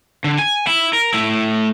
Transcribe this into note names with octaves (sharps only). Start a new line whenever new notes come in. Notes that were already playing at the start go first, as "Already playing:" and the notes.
D3
G#5
E4
A#4
A3 E4